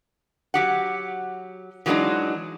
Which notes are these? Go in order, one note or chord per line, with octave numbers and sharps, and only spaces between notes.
F#3 G4 F#5
E3 F#3 G#3 A3 D4 D#4